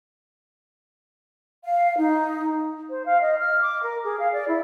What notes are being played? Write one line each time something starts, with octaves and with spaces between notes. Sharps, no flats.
F5
D#4
C5
F5
D#5
F6
D6
A#4
G#4
F5
D5
E4